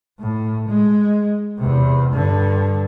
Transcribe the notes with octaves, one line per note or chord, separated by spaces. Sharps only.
A2
G#3
E2 C3
G2 D3